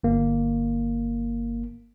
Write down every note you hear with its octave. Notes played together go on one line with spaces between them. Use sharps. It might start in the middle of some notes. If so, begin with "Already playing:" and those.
G1 A#3